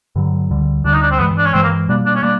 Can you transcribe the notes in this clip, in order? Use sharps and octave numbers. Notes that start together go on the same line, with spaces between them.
G2 D3 F#3
D2 D3 G3
D2 D3 G3 D4
D#4
D4
C4
G2 E3 G#3 B3
D4
C#4
G2 E3 G#3 C4
A#3
B2 G3 A#3 D4
D4
C#4
G3 A#3 D4